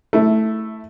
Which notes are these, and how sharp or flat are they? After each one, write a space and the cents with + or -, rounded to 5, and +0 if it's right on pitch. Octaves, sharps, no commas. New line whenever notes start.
A3 +0 E4 -15